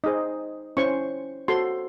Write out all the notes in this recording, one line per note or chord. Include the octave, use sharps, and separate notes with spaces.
D#4 G#4 C5 D#5
C#4 E4 C5 C#6
F#4 A4 C5 C6